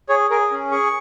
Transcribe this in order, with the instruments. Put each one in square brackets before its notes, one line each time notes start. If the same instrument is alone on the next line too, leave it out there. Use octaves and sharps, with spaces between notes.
[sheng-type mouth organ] G#4 C#5
G#4 A#4
C#4
G#4 C#6